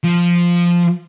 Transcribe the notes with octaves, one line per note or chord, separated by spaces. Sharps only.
F3